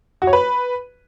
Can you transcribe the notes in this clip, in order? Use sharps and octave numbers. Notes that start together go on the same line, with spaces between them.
F#4
C#5
B4